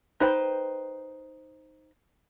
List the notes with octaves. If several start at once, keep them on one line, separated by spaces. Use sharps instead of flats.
D#4 B4 C5 G5